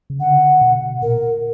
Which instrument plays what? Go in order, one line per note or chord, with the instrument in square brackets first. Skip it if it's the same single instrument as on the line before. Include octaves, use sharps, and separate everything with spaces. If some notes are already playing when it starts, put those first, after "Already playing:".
[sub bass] C#3
[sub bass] D3 [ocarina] F#5
[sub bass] B2
[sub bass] A#2 [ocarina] A#4